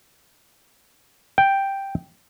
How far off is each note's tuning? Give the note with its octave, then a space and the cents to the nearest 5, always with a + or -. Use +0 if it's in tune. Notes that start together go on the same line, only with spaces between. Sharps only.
G5 +0